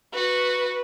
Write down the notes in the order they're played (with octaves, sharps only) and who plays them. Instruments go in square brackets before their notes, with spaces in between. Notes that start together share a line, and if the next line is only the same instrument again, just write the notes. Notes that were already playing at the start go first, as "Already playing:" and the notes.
[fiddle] F#4 [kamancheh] B4